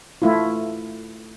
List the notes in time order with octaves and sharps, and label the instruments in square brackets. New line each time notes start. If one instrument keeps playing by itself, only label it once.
[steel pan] A3 E4 F4